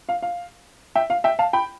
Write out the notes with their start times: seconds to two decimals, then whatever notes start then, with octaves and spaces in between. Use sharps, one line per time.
0.09 F5
0.22 F5
0.95 E5 G5
1.10 F5
1.24 E5 G5
1.39 F5 A5
1.53 G5 B5